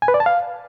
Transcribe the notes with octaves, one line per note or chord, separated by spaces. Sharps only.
G#5
B4
D5
A5
F5